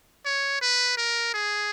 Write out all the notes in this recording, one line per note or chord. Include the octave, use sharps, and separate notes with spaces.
C#5
B4
A#4
G#4